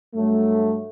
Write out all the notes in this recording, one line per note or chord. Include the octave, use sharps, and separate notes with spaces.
G2 F#3 A3